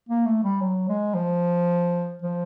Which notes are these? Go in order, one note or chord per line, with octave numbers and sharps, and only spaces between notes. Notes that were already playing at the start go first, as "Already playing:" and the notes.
A#3
A3
G3
F#3
G#3
F3
F3